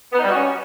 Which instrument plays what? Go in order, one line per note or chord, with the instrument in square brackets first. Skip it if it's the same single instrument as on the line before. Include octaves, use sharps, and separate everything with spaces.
[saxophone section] B3
D#4
G3
F#4
C#4